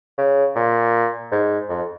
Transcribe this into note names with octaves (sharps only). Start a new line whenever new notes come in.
C#3
A#2
G#2
F2